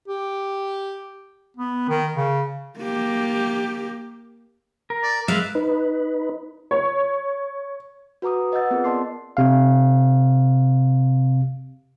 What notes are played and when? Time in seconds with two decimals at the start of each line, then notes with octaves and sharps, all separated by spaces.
0.08 G4
1.57 B3
1.89 D#3
2.16 C#3
2.79 A#3 G4
4.90 A#4
5.03 D5
5.28 G#3 B4 E5 F5
5.55 D#4 B4
6.71 C#5
8.22 F#4 B4 A#5 D6 D#6
8.52 B4 D#5 F#5 E6 G6 A6
8.71 B3 C4 F4 G#4 A#4
8.84 D5 D#5 A5 C6 D6 C7
9.37 C3 F5